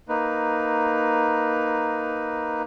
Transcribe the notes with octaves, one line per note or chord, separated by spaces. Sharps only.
A#3 D#4 B4